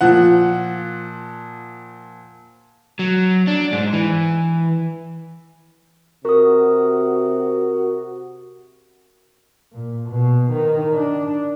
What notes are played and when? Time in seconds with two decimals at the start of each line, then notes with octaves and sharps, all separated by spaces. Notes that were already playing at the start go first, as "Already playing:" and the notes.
0.01 A#2 F3 F#5
2.99 F#3
3.47 D4
3.72 G#2
3.93 E3
6.25 C3 F#4 A#4 D#6
9.73 A#2
10.09 B2
10.51 D#3
10.92 D4